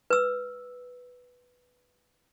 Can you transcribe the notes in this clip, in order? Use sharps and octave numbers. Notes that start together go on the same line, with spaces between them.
B4 E6